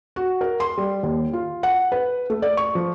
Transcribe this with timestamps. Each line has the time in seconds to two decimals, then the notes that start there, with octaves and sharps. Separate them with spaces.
0.16 F#4
0.41 A#4
0.60 C6
0.77 G3
1.03 D#2
1.33 F4
1.63 F#5
1.92 B4
2.30 A3
2.42 D5
2.57 C#6
2.75 F3